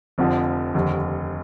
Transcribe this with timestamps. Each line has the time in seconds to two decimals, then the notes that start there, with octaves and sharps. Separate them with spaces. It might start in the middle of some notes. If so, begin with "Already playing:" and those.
0.18 F1 F2 D3 F3
0.74 F1 D#2 D3